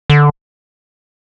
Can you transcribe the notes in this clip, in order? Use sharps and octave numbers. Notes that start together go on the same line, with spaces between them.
D3